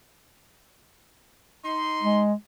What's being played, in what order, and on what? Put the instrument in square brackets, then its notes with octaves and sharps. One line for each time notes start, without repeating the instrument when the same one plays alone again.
[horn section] D#4 C6
[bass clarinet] G#3